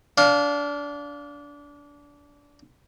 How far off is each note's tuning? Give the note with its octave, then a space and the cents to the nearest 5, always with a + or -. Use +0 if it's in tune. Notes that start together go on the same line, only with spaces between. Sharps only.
D4 -25 F5 +10